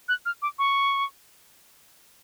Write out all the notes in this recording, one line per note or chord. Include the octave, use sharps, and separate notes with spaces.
F#6
F6
D6
C#6